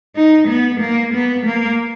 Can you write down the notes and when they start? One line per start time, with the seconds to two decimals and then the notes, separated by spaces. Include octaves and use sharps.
0.16 D#4
0.48 B3
0.80 A#3
1.13 B3
1.45 A#3